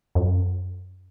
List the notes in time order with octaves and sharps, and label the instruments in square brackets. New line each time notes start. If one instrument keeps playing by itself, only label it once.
[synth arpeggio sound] F#2